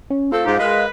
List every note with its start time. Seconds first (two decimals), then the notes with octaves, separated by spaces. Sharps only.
0.10 C#4
0.32 A3 C4 F4 A4
0.45 G#2 D#4 G4
0.59 G#3 A#4 B4